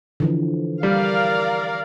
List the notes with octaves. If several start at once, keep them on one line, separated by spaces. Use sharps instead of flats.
D3 E3 F3
G3 A#4 D5 F5